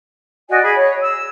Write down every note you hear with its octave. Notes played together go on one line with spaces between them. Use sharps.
F#4 D5 D#5 G#5
G#4 B5
C#5
E6